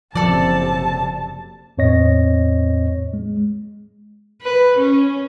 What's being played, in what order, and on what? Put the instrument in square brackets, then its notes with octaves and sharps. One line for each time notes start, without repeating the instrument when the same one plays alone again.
[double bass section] F#1 C3 [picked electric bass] F3 [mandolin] A4 D5 [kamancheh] A5
[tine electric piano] E2 A2 C4 C#5 D#5 A#6
G#3
[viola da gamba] B4
C#4